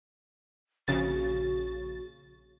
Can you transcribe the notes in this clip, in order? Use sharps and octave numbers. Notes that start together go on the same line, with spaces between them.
A#1 C#3 F#4 A6